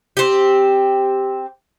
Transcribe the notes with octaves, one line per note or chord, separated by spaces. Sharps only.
C4 G4